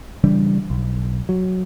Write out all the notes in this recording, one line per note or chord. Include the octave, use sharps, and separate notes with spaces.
C#3 E3 G3 D4
B1
F#3